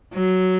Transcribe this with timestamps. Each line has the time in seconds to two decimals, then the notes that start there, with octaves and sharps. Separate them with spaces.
0.14 F#3